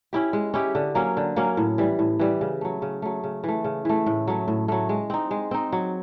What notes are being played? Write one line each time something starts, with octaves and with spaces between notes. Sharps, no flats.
C#4 E4 G4
G#3
C#4 E4 G4
D3
F#3 A#3 C#4
D3
F#3 A#3 C#4
A2
E3 G3
A2
E3 G3
C#3
F#3 A3
C#3
F#3 A3
C#3
E3 A3
C#3
E3 A3
A2
F#3 A3
A2
F#3 A3
G#3
C4 D#4
G#3
C4 D#4
F#3